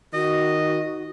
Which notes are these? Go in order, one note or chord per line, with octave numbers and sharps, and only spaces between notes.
D#3 F#4 D#5